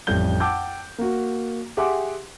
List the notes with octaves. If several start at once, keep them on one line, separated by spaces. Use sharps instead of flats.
A1 F2 G3 G6 G7
F#5 G5 A5 D6 E6 G6
A#3 F#4
G4 G#4 E5 F#5 C6 D6